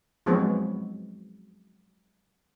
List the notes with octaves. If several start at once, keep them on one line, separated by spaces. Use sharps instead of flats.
F3 F#3 G#3 B3 C4 F#4